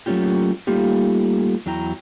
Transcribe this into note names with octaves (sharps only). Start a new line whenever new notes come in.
F#3 A3 A#3 C#4 F4 G4
G3 A3 A#3 D#4 F4 G4
E2 F#3 E4 G5 A#5